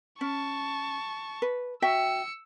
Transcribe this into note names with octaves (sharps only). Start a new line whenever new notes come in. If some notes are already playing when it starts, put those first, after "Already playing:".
C#4 A5 C#6
B4
F#4 E5 G5 E6 C#7